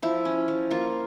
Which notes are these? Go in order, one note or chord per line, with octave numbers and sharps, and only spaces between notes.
F3 E4
C#4
F3
A#3 F4